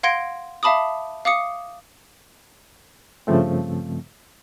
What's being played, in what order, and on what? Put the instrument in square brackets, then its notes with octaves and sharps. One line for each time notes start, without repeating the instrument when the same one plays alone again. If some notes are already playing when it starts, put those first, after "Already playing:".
[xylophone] F5 F#5 C6 G#6 A#6 D7
E5 F5 A5 B5 D6 D#6
F5 D6 D#6 C#7
[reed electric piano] G2 C#3 F3 A3 C4